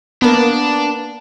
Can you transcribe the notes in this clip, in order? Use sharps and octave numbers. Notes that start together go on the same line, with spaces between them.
A#3 B3 D4